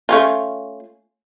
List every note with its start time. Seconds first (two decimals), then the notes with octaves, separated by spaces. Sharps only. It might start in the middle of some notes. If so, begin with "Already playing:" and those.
0.09 A3 C#4 F4